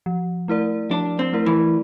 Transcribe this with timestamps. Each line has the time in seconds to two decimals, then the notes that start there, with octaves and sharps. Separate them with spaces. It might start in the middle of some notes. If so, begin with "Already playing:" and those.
0.06 F3
0.48 A3 E4 A#4 D5
0.90 F3 D4
1.19 C4
1.33 A3 E4 A#4 D5
1.46 E3